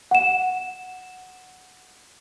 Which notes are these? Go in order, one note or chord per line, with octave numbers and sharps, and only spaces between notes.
F#5 E7